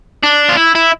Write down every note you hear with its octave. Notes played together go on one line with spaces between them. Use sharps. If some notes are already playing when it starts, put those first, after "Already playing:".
D4
F4
E4
E4